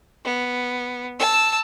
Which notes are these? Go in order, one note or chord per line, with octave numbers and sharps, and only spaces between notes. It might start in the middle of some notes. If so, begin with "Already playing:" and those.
B3
A5 E6